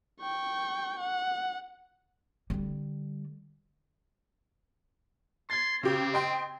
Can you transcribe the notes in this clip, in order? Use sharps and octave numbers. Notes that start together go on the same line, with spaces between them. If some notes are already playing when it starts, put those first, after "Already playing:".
G5 C#6
F#5
D3 G3
C6 G#6 A6
C#3 C4 G4
D#5 G5 C6